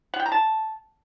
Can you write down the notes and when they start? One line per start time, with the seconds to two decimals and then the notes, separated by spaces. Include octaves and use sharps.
0.14 F#5
0.20 G5
0.26 A#5
0.32 A5